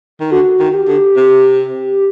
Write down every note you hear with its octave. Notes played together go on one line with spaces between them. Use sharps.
D#3
D3 F#4
D#3
G4
D3
C3